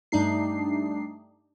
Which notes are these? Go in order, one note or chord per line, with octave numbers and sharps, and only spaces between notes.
G2 G3 A3 D4 D#4 C7